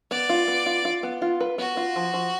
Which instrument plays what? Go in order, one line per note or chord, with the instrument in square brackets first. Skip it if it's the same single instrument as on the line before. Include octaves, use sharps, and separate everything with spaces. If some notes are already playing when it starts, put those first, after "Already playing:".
[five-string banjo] B3 [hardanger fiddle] D5
[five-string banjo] F4
B3
F4
F4
B3
F4
B4
[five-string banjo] B3 [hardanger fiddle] F#4
[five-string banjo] F4
F3
F3